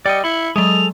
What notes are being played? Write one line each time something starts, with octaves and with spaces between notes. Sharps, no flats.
G3 D5 D#5 C#7
E4 B5 C#7
F#3 G#3 G#4 A4 D#5 F7